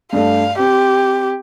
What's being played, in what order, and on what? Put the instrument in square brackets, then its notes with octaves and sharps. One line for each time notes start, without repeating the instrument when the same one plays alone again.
[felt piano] G2 A3 [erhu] F5
[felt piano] C4 [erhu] G4